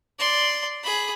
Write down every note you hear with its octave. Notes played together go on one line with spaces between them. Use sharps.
D5 C6
G#4 B5